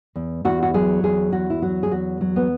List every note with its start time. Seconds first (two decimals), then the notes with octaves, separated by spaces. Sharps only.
0.16 E2
0.45 E2 F#4
0.63 F#4
0.74 F#3 G#4
1.03 E2 G#4
1.32 E2 F#4
1.50 E4
1.62 F#3 F#4
1.83 G#4
1.92 E2 F#4
2.21 F#3
2.36 B3